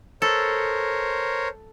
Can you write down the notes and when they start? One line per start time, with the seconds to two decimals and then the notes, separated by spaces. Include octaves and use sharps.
0.22 A4 A#4 C5 C#5